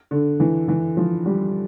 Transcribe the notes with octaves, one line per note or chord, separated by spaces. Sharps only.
D3
E3
E3
F3
G3